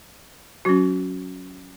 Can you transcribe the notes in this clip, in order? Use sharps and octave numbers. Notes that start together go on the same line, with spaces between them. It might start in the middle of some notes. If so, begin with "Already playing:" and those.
F#3 C#4 F#4